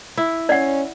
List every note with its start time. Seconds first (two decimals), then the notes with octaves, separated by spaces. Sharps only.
0.17 E4
0.49 C#4 D5 F#5